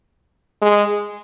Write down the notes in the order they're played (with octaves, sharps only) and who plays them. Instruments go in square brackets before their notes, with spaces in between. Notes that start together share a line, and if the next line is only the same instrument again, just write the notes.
[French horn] G#3